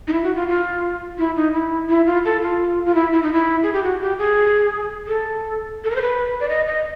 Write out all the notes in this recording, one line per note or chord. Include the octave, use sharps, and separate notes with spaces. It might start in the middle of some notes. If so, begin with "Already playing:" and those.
D#4
E4
F#4
F4
F4
E4
D#4
E4
E4
F4
A4
F4
F4
E4
E4
D#4
E4
G#4
G4
F#4
G4
G#4
A4
A4
A#4
C5
B4
D5
D#5
D#5